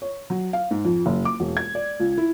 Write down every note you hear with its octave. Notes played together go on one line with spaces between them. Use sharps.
C#5
F#3
F5
G#2
F2
F#1
D6
E1
G#6
D5
C#2
E4